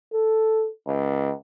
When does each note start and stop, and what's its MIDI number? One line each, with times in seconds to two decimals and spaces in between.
0.13 0.68 69
0.87 1.32 37